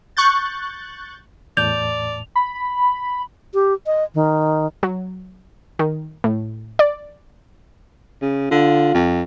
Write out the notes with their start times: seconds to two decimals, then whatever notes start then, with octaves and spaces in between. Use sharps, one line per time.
0.17 C#6 F#6 G6 A6
1.57 E2 A2 D5 A5 G6 F7
2.35 B5
3.54 G4
3.86 D#5
4.15 D#3
4.83 F#3
5.79 D#3
6.24 A2
6.79 D5
8.22 C#3
8.51 D3 F4
8.94 F2